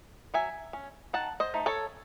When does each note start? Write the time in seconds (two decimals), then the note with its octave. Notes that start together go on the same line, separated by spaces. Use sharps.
0.34 F#3 E5 G#5
0.73 C#4
1.13 D#3 F#5 A5
1.40 C5 D#5
1.54 A3 D#4
1.66 A4 C#5